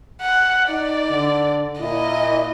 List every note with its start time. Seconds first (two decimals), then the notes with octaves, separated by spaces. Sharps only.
0.22 F#5
0.69 D#4 D5
1.10 D3
1.80 A#2 E4 D#5